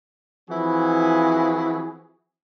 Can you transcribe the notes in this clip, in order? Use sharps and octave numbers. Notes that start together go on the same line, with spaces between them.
E3 F3 C4 E4 F#4 G#4